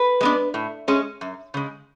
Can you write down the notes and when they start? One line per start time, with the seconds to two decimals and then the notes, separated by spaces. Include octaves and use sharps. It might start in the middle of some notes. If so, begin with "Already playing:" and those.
Already playing: B4
0.21 G#3 B3 D4
0.54 A2
0.88 G#3 C#4
1.21 F#2
1.54 C#3 G#3